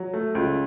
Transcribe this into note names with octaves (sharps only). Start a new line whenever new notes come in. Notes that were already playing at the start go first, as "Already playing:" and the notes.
Already playing: F#3
A3
C#2